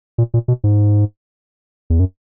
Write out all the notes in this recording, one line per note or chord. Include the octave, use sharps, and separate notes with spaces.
A#2
A#2
B2
G#2
E2
F#2